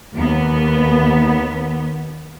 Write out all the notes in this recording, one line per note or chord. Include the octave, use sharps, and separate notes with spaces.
D#2 B3